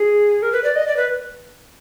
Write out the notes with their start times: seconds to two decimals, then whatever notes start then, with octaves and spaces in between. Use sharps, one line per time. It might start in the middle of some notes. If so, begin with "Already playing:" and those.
Already playing: G#4
0.42 A#4
0.52 B4
0.64 D5
0.76 D#5
0.88 D5
0.97 B4